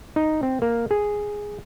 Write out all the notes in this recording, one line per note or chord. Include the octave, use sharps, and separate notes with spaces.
D#4
C4
A#3
G#4